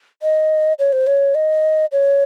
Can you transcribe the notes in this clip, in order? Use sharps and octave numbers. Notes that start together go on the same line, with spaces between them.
D#5
C#5
C5
C#5
D#5
C#5